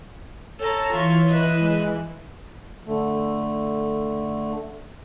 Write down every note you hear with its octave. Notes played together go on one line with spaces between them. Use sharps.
A4 C#5 A5 A#5
E3 F4 E5 C#6
B4 D#5 E5
G#3
D3 A3